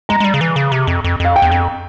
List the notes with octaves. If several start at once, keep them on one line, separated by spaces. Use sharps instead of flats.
G#3 A#5
G#3
G3
C#3
E3
C#3
C3
F2
F2
F2 F5
G5
E2
F2